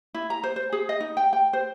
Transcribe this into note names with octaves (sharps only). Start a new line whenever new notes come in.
E4
A#5
C5
C5
G#4
D#5
D#4
G5
G5
C5